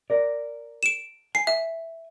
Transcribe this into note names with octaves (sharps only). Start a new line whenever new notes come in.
A#4 D5
D7 E7
G#5 C7
E5